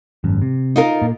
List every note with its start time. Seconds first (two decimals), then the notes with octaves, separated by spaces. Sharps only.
0.24 G#1 F#2
0.42 C3
0.76 D#4 F4 A#4
1.02 A#2